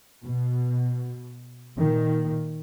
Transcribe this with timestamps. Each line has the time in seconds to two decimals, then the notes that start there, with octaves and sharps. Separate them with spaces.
0.24 B2
1.77 A#2 D#3